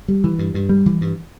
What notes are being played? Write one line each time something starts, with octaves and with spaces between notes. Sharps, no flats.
G3
E3
G2
G2
G3
E3
G2